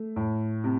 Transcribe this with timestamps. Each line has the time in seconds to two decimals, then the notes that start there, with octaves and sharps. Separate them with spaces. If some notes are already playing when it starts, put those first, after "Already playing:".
Already playing: A3
0.16 A2
0.64 C3